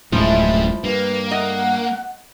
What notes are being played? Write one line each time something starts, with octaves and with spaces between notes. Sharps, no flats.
D1 F#2 A2 F3 G3 G#3 D4 E4
G2 A#3 B4
D#5 F#5